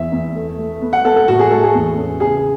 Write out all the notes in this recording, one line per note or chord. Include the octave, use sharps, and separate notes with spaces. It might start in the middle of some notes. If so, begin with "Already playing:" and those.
Already playing: E2 E5
E2
A3
A3
B3
F#5
B3 A4
A4
A2 F#4
G#4
G#3 A4
G#4
E2
C#4
C#3 G#4